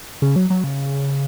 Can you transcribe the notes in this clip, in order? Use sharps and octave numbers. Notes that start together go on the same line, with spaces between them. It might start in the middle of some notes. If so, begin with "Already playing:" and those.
C#3
F#3
F#3
C#3